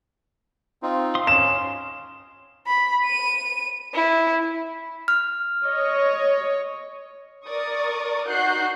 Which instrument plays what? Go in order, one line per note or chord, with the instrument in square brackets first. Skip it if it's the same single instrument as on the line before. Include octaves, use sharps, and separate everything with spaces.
[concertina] C4 D#4 F4
[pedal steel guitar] F5 C6 D#6
[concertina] C#4 [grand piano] E7
[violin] B5
D#7
E4
[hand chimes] F6
[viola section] C#5 D#5
[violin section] A#4 D5 C#6 D#6
D#4 F#4 F#5 F#6 G6 C7